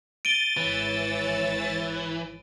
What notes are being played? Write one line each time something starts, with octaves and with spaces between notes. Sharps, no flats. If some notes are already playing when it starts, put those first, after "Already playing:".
A6 D7 D#7 G7
G#1 E3 C#5 E6